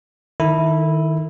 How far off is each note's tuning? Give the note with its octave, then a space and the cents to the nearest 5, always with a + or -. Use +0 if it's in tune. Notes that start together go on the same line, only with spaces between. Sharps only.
D#3 +0 E4 -10 A4 +35